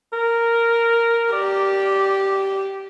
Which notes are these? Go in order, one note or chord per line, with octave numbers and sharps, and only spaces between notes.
A#4
G4 D5